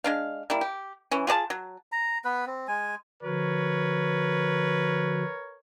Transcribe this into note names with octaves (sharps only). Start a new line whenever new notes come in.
G#3 D4 F5
G3 A#3 E4
G4
E3 C#4
F4 G#4 D5 A5
F#3
A#5
B3 B4
C4
G#3 G#5
D3 F3 F#4 A#4 B4 C#5